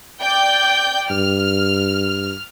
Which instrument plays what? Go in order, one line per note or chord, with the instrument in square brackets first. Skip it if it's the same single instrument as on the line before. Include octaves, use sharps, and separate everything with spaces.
[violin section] D5 G5 G6
[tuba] G2 [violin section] F6